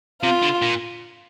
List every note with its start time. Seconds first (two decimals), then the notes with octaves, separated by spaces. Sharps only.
0.23 C3 F4
0.42 D3
0.62 A#2